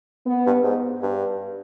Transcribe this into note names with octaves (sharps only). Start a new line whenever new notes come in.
B3
G2
G#2
G2